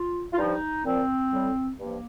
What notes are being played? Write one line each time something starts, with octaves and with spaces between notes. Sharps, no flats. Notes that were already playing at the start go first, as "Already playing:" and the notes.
Already playing: F4
F4
G2 F3 D#4
A#2 F3 C4
A2 G3
G2 F3 A#3